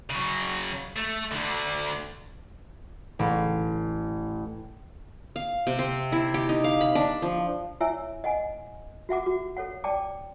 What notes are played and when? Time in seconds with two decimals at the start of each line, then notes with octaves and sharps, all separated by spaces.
0.10 C#3 F#3
0.96 A3
1.32 D2 D3
3.19 A1
5.36 F5
5.67 C3
5.79 C4
6.12 E4
6.34 G4
6.49 D#4
6.64 F5
6.81 B5
6.95 D4
7.22 F3
7.80 E4 C#5 E5 G#5 E6
8.24 D#5 F#5 G#5
9.09 F#4 E5 F#5 D6
9.26 F#4
9.57 A4 C#5 F#5
9.84 D5 G5 A5 D6